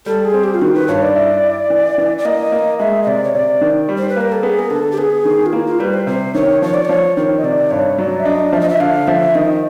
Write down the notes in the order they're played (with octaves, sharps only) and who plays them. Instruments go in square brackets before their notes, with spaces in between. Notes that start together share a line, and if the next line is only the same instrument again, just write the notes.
[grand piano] G3 [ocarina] A4
[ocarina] G#4
[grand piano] C4
[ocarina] G4
F4
[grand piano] D#3 [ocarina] F#4
[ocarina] B4
[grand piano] G2 [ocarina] C#5
[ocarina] D5
[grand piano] E4
E4
E3
E3
[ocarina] D5
[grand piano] A#3 [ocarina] D#5
[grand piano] A#3
[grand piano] G#3 [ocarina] E5
[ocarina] D#5
[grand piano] C3 [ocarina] D5
[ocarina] C#5
[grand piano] C3 [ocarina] D5
[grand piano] D#3
G3
[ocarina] C5
B4
[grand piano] A#3 [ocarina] A#4
[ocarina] A4
[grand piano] B3 [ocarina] G#4
[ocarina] A#4
[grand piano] D3 [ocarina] A4
[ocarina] G4
[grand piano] B3 [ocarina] G#4
[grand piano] D#3
[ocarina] F4
[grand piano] A#3 [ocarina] E4
[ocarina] F4
[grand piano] G3 [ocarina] B4
[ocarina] C5
[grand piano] C3 [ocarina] C5
[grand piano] D#3 [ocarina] C#5
[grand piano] F3 [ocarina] C#5
[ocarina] D5
[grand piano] F3 [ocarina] C#5
[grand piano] D#3 [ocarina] C#5
[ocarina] D#5
[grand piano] C3 [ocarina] D5
[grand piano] G2 [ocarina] C#5
[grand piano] F#3 [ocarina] D5
[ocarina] E5
[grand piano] D4 [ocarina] D#5
[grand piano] F3 [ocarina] E5
[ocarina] D#5
E5
[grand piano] D3 [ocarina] F5
[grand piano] F3 [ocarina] E5
[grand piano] D#3 [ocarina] D#5